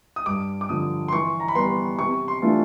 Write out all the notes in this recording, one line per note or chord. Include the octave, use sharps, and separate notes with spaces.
D#6
G2 D6
D6
D3 F3 D#6
C6
E3 C#6
A#5
B5
G3 B3 C6
C3 C#6
C6
E3 A3 D4 F4